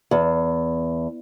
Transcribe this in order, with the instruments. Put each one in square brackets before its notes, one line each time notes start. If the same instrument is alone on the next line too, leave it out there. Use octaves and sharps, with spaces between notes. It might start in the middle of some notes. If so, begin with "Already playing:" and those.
[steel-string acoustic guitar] E2